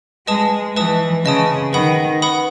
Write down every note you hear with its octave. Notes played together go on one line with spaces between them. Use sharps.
G#3 B4 D#5 A5 D#6
E3 B4 D#5 A5 D#6
C#3 B4 D#5 A5 D#6
D#3 B4 F#5 B5 D#6
B4 F#5 B5 D#6